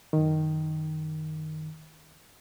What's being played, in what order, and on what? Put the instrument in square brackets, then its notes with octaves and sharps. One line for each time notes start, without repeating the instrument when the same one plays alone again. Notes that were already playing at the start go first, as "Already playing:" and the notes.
[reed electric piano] F#2 D#3